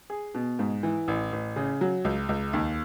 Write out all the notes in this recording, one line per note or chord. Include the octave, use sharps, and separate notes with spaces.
G#4
B2
G#2
E3
A1
A1
C#3
F#3
C#2
C#2
D#2